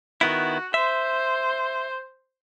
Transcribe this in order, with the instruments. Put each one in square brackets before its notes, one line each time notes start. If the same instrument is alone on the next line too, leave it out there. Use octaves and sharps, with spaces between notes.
[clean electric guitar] D#3 B3 E4 [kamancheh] F#4
[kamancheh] C5 [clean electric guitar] E5